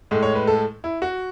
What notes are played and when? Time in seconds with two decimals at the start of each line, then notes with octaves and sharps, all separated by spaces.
0.11 A2 G#3
0.23 C#5
0.35 B4
0.47 A4
0.84 E4
1.02 F#4